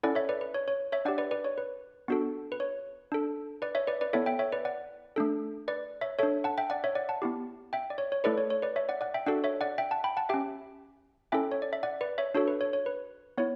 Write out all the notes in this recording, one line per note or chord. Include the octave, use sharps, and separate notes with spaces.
C#4 E4 A4 D5 F#5
C#5 E5
B4 D5
B4
C#5
C#5
C#5 E5
D4 G4 D5 F#5
B4 D5
B4 D5
C#5
B4
B3 D4 F#4 A4
B4
C#5
D4 A4
B4 D5
C#5 E5
B4 D5
B4 D5
B3 E4 A4 C#5 E5
E5 G5
C#5 E5
B4 D5
D5 F#5
A3 D4 A4
B4 D5
C#5 E5
D4 A4 C#5 E5
F#5 A5
E5 G5
D5 F#5
C#5 E5
D5 F#5
F#5 A5
B3 E4 G4
E5 G5
D5
C#5
C#5
A3 E4 A4 B4 D5
C#5
C#5
B4 D5
C#5 E5
D5 F#5
D5 F#5
E5 G5
D4 F#4 A4 D5 F#5
C#5 E5
D5 F#5
E5 G5
F#5 A5
G5 B5
F#5 A5
C#4 G4 E5 G5
C#4 E4 A4 E5 G5
C#5
D5
E5
D5 F#5
B4 D5
C#5 E5
D4 F#4 A4 C#5
B4
C#5
C#5
B4
B3 E4 C#5